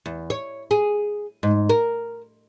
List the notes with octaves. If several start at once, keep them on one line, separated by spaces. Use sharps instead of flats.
E2
C#5
G#4
G#2
A#4